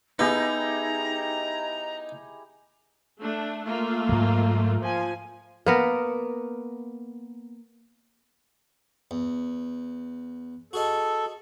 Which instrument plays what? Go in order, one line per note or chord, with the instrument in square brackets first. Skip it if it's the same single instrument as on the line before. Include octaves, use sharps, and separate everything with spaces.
[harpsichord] B3 [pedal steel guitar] D#4 [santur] E4 G4 G#4 [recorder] A#5
[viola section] A3 D4
A3 A#3 F4
[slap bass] G#2 F#3
[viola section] F3 G#5
[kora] A#3 B3 A#4
[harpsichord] E2
[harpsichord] F#4 G#4 D#5 [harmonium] A4